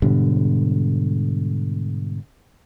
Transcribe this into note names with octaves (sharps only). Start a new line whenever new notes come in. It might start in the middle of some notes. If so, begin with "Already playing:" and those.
G#2 B2 D3 G3